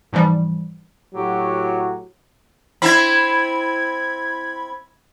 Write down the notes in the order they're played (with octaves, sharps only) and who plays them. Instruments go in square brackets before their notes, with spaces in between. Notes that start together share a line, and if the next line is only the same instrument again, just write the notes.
[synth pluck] G#2 E3 F3 G3
[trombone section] A2 F#3 [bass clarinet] G4
[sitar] C4 E4 [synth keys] B5 G#6